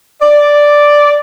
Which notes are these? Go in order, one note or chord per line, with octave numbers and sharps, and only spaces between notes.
D5